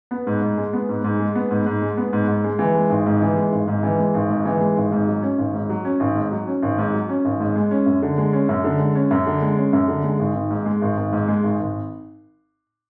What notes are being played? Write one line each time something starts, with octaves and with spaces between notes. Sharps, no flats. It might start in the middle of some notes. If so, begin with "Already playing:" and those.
B3
G#2
G#2
G#3
B3
G#2
G#2
G#3
B3
G#2
G#2
G#3
B3
G#2
G#2
G#3
E3
G#3
G#1
G#2
E3
G#3
G#1
G#2
E3
G#3
G#1
G#2
E3
G#3
G#1
G#2
F#3
C#4
G#1
G#2
F#3
C#4
G#1
G#2
F#3
C#4
G#1
G#2
F#3
C#4
G#1
G#2
G#3
C#4
F#2
D3
G#3
C#4
F#2
D3
G#3
C#4
F#2
D3
G#3
C#4
F#2
D3
G#3
G#1
G#1
G#2
G#3
G#1
G#1
G#2
G#3
G#1
G#1